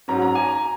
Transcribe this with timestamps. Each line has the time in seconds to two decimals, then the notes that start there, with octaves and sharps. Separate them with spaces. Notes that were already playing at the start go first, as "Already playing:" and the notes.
0.08 G#2 F#3 C#4 A#5
0.22 A#5
0.35 G#5
0.48 A#5